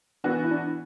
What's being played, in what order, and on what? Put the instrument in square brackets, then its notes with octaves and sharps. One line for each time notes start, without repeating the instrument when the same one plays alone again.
[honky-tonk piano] E3 B3 F#4 [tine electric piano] D4
[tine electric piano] E4
D4